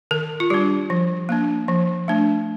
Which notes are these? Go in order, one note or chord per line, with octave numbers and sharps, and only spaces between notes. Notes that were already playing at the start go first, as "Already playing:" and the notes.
D#3 A#4
F4
G3 D4 G4
F3
A#3 D4
F3
A3 D4